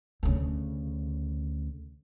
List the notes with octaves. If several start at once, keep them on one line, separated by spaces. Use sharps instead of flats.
D2 C#3